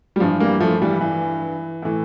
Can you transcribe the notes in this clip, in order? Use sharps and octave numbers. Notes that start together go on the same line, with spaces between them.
G3
G2 E3 F3
G3 A#3
F3 A3
E3 G3
E3
A2 E3